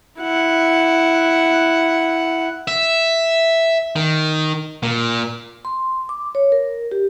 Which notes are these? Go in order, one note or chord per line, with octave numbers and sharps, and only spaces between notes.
E4 F#5
E5
D#3
A#2
C6
D6
C#5
A#4
G4